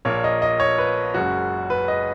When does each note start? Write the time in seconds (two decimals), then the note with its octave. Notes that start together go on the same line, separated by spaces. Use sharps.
0.05 A#1 A#2 A#3 C#5
0.24 D#5
0.42 D#5
0.60 C#5
0.78 B4
1.14 F#1 F#2 C#3 G#3 F#4
1.70 B4
1.88 D#5